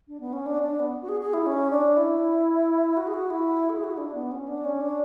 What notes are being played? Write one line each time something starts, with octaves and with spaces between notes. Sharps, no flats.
D4
B3
C#4
D4
D4
B3
F#4
G#4
G#4
E4
C#4
D4
E4
F#4
G#4
F#4
E4
A4
G#4
F#4
E4
D4
B3
C#4
D4
C#4
D4